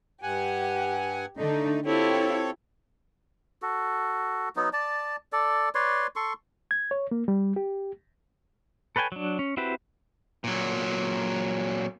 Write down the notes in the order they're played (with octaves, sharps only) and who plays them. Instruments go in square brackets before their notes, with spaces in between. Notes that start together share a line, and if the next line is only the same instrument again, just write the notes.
[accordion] G2 F#5 G#5 [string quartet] G4
[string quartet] D3 D4 [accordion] A3 D#4
[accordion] C4 A4 C#5 [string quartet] E4 F4 G4
[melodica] F#4 A4
F#3 B3 D#4
D5 A5
A4 D5
B4 C#5 D5 C6
A4 C6 C#6
[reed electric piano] G#6
C#5
A#3
G3
G4
[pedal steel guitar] A4 B4 C#5 G5 G#5
F#3 D4
C#4
C4 E4 F#4 G4 B4
[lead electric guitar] A#2 F#3